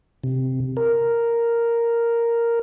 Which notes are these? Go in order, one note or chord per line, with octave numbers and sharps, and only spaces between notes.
C3
A#4